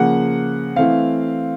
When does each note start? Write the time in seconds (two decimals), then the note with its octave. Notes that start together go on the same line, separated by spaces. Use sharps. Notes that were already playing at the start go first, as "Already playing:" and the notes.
Already playing: C#3 F3 A#3 F#5
0.76 E3 A3 C4 F5